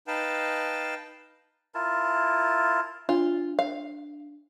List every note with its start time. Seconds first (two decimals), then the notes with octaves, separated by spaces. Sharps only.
0.07 D#4 B4 F5 G5 A5
1.74 E4 F4 A#4 A5
3.09 D4 F4
3.59 F5